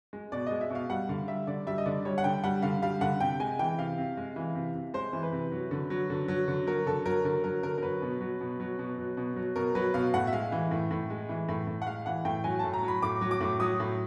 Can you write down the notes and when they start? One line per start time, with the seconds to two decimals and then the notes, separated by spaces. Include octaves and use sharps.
0.13 G#3
0.32 B2 D5
0.46 G#3 D#5
0.61 E5
0.70 B2 F5
0.90 G3 F#5
1.09 D3 F5
1.28 G3 E5
1.47 D3 D5
1.67 G3 E5
1.78 D#5
1.86 D3 D5
2.05 G3 C#5
2.18 F#5
2.24 D3 G5
2.44 G3 F#5
2.62 D3 F5
2.82 G3 F5
3.01 D3 F#5
3.20 C3 G5
3.40 G#3 G#5
3.59 E3 G5
3.78 C3 F5
3.98 C3
4.17 G#3
4.36 E3
4.55 C3
4.75 C3
4.94 G#3 C5
5.13 E3
5.23 B4
5.32 C3
5.52 F#3
5.71 D3
5.90 F#3
6.10 D3
6.28 F#3
6.48 D3
6.67 F#3 A#4
6.86 D3 A4
7.06 F#3 A#4
7.24 D3 A#4
7.44 F#3 A#4
7.63 D3 A#4
7.78 A#4
7.82 F#3 B4
8.02 B2
8.21 F#3
8.41 B2
8.60 F#3
8.79 B2
8.98 F#3
9.17 B2
9.36 F#3
9.56 B2 A#4
9.75 F#3 B4
9.94 B2 F5
10.14 A2 F#5
10.27 E5
10.33 G#3 F5
10.52 E3
10.71 A2
10.91 A2
11.10 G#3
11.29 E3
11.49 A2
11.67 A2
11.82 F#5
11.87 G#3 F5
12.06 E3 F#5
12.25 A2 G5
12.44 F#3 G#5
12.59 A2 A5
12.73 A#5
12.83 F#3
12.88 B5
13.02 A2 D6
13.21 F#3
13.31 D6
13.41 A2
13.60 F#3 D#6
13.80 A2